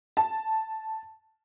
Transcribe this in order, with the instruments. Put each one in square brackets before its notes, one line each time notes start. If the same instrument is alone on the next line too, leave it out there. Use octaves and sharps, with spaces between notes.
[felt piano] A5